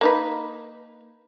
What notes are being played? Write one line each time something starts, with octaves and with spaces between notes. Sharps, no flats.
A#3 D#4 B4